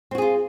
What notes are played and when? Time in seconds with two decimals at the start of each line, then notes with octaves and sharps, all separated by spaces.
0.11 C4
0.15 F#4
0.18 G#4
0.22 F4